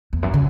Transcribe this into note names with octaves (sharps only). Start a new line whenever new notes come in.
E2
F#2
C#3